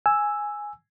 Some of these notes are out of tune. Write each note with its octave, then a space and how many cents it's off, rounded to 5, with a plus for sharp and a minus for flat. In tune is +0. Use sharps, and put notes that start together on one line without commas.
G#5 +0 E6 +0